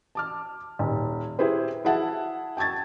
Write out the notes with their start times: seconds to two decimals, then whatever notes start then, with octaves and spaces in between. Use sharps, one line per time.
0.15 A5 D6 F6
0.79 D#1
1.39 E4 G4 G#4 B4 C5
1.85 E4 G#4 E5 F#5 A5
2.57 G5 A5 C#6 G#6 A6